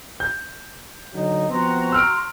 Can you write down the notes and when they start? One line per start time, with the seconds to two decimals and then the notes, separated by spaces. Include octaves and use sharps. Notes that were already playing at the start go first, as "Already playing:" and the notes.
0.20 G6
1.14 D3 F#3 D#4
1.49 F3 B3 C4 F#4 A#5 C6
1.92 E6 F6 D7